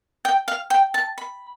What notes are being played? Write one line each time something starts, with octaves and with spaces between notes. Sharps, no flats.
G5
F5
G5
A5
B5